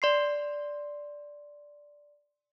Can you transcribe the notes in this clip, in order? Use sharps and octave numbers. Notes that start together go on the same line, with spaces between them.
D5 C6 C7